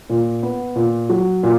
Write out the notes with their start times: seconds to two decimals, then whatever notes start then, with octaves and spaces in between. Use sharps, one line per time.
0.10 A#2
0.43 B3
0.76 A#2
1.09 F#3
1.43 A#2